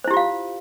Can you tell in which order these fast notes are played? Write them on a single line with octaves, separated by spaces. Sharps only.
C5 E4 G4 F4 F5